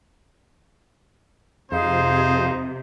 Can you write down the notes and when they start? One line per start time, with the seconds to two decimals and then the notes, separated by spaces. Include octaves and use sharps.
1.72 F2 C3 D#4 G#4 C5 F5